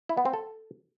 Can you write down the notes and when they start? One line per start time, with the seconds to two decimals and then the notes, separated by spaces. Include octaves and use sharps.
0.09 E4
0.17 B3
0.25 C4
0.34 A4